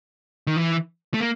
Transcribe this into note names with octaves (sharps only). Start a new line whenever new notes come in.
D#3
E3
A3
A#3